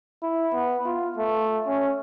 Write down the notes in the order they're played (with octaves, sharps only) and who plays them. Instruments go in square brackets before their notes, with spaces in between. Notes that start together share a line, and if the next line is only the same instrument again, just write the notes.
[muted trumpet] E4
B3
F4
A3
C#4